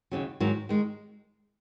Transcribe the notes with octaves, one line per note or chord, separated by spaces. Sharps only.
D#2 C#3 F#3
G#2 D#3 F#3
D#3 G#3